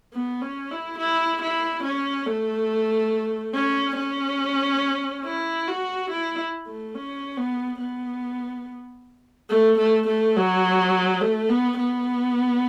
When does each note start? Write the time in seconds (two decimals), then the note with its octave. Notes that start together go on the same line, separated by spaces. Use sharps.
0.13 B3
0.42 C#4
0.71 E4
0.98 E4
1.42 E4
1.84 C#4
2.27 A3
3.54 C#4
3.96 C#4
5.25 E4
5.68 F#4
6.10 E4
6.67 A3
6.95 C#4
7.37 B3
7.80 B3
9.50 A3
9.79 A3
10.08 A3
10.36 F#3
11.21 A3
11.49 B3
11.78 B3